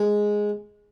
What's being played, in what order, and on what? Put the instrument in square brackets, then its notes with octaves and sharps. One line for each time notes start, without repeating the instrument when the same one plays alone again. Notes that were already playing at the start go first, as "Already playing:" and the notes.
Already playing: [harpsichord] G#3